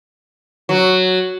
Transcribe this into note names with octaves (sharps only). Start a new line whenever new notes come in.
F#3